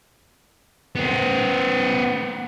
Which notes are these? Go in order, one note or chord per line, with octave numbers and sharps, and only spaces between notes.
B3 C5